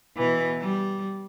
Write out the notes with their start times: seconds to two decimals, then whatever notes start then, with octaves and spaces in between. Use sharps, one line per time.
0.17 B2 E3
0.60 G3